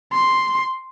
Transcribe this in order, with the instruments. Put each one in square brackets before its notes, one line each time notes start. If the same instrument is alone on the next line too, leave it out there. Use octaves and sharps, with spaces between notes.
[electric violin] C6